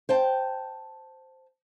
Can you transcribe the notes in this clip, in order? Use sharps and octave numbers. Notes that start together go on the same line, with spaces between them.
C5 G5 A5